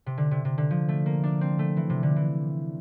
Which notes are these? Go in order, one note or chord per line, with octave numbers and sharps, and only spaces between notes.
C3
D3
C3
C3
D3
F3
A3
A#3
D4
C4
A3
E3
C3
D3
E3